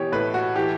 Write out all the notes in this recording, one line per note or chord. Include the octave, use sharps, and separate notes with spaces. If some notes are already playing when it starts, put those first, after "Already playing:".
Already playing: B2 E3 G4 C#5
A2 B4
F#4
E3 G4